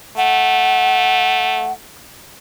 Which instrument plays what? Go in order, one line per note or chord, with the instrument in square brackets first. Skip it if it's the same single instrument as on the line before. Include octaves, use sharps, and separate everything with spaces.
[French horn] A3 [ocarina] F#5